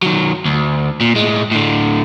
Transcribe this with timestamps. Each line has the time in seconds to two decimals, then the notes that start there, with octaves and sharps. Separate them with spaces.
0.02 D#3 F#3
0.45 D2
1.01 A#2
1.15 A2 G#3
1.51 A2 D3